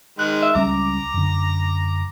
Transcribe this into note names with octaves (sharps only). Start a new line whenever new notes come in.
D#3 G#3 F#6
E5
C#2 G3 C#4 A#5 D6
F#2 D3